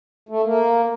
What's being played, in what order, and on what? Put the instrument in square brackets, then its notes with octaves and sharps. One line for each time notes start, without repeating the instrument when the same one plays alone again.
[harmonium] A3
A#3